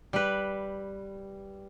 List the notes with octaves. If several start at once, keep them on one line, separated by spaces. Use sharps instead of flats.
G3 B4